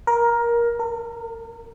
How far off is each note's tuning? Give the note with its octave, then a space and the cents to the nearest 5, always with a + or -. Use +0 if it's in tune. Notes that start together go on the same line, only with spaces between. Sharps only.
A#4 +15
A#4 -40